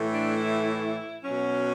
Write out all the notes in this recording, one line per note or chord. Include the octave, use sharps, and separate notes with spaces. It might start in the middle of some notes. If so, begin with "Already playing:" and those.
Already playing: A2 E3 A3
D4
E4
B2 F#3 C#4